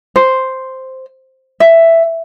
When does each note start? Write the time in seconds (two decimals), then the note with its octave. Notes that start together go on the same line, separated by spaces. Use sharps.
0.16 C5
1.60 E5